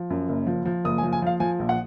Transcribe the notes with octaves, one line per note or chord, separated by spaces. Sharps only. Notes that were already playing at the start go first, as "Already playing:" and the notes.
Already playing: F3
F#2
F#1
F3
F3
F#1 D#6
G#5
F3
G#5
F3 F5
F3 G#5
A#1
F#5